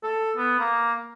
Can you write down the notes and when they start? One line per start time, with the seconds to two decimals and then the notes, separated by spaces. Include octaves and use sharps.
0.03 A4
0.37 B3
0.59 A#3